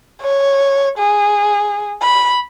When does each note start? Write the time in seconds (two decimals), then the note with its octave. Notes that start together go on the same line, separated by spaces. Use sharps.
0.22 C#5
0.98 G#4
2.02 B5